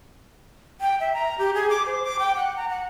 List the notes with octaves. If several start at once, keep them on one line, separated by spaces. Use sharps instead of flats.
G5
E5
A#5
G4
G#4
D6
C5
D6
G5
F#5
A#5
F#5